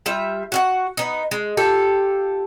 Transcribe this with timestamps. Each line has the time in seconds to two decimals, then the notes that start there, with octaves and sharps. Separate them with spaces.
0.06 G3 F4 E5
0.52 F#4 F5 F#5
0.97 B3 D#4
1.31 G#3
1.57 F4 G4 A4